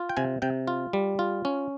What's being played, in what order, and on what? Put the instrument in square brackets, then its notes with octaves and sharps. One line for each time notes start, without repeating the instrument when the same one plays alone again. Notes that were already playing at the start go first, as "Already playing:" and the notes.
Already playing: [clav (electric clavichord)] F4
G5
C3 G#5
C3 G5
F4
G3
F4
C#4